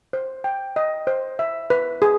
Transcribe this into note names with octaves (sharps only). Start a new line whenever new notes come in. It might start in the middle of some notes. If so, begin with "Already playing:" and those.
C5
G5
D#5
C5
E5
B4
G#4